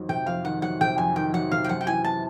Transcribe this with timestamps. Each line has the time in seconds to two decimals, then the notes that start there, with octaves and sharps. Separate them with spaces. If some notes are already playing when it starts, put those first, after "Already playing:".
Already playing: F2 D#3 F#3
0.09 C3 G5
0.26 F2 F5
0.44 D#3 F#5
0.62 F#3 F#5
0.81 C3 G5
0.98 F2 G#5
1.16 D#3 G5
1.33 F#3 F#5
1.52 C3 F5
1.64 G5
1.69 F#2 F#5
1.81 G5
1.87 E3 G#5
2.04 A5